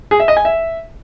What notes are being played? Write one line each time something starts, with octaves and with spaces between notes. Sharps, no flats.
G#4
E5
D#5
G#5
E5